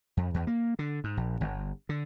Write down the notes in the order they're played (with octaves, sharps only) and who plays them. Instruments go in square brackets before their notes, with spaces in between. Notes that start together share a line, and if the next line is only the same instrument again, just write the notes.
[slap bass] F2
E2
A#3
D3
G#2
A#1
G1
D3